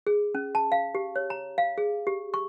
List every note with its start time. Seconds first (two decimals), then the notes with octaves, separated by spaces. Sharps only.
0.07 G#4
0.35 C#4
0.55 A5
0.72 F5
0.95 G4
1.16 C#5
1.30 A#5
1.58 F5
1.78 G#4
2.07 G4
2.34 C#6